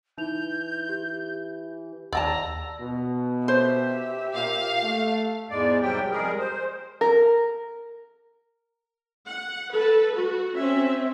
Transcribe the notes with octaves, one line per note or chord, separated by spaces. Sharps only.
E3 D#4 G6 F7
G4
D#2 D5 G5 A5 A#5 E6
B2
G4 C5 E5
A#2 F5
A3
E2 G#2 G#3 D5
G#2 C3 F#3 G3 G4 G5
F2 G3 G#3 G#4 A#4
C5
A#4
F#5
A4 B4
F#4
C4 C#4 E5